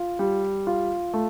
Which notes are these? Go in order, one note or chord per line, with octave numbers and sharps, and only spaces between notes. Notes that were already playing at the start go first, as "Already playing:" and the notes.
Already playing: F4
G3
F4
A3